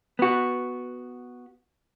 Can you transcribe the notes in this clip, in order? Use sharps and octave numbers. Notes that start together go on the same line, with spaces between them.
B3 F#4